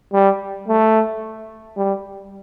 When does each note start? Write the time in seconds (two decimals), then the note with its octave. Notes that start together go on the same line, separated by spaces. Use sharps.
0.13 G3
0.68 A3
1.77 G3